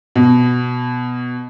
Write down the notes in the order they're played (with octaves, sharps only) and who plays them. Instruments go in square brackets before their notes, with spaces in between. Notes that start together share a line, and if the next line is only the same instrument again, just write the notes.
[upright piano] B2